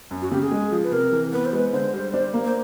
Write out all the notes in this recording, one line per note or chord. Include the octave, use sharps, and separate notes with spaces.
F#2
F#4
C#3 G4
G#4
G#3
F3
B4
C3 A#4
E3
B3 B4
C5
G#3 B4
D3 C5
G3
D4
A#3
C5